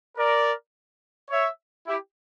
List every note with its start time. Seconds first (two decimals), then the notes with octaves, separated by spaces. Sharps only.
0.17 A#4 D5
1.30 C#5 E5
1.87 E4 G4